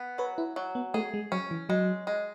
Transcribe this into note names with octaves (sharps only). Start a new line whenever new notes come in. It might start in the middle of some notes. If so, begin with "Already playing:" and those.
Already playing: B3
F#3 B4
E4
F#3
B3
A3 G#4
G#3
F#3 C#4
E3
F#3 G#3
G#3